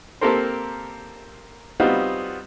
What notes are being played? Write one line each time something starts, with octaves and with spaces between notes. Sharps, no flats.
A#3 C4 G4 A4 A#4 C5
G3 B3 C4 D#4 F4 F#4